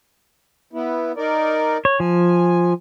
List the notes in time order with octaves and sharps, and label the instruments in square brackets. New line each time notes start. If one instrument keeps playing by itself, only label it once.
[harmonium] B3 E4
D#4 A#4 D5
[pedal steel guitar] C#5
[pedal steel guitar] F3 [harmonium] G#5